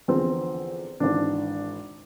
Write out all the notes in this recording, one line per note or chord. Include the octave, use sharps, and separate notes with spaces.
E2 D3 F3 C4
G#1 G#2 E3 D4